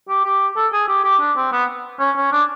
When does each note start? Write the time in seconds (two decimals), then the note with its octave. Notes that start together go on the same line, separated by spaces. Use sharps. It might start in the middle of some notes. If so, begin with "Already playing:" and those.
0.09 G4
0.24 G4
0.56 A4
0.73 G#4
0.88 G4
1.04 G4
1.21 D4
1.37 C4
1.52 B3
2.00 C#4
2.16 C#4
2.32 D4